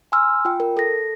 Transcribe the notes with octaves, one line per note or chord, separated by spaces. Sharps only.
G#5 A#5 C6 E6 F6
F4 G5
A#4
A4 A#6